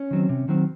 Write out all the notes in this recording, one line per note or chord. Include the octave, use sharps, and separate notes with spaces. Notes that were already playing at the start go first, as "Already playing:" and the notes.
Already playing: C#4
D#3 F#3 C4
C3
D#3 F#3 C4